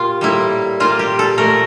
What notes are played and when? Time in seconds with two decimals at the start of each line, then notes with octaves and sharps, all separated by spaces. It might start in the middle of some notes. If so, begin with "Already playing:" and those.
Already playing: A#2 F4 G4
0.21 A2 G3 A#3 E4
0.80 A#2 G3 A#3 F4
0.99 G4
1.19 A4
1.38 A#2 A3 A#4